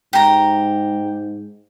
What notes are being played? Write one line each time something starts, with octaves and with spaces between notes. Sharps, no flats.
G#2 G4 A#5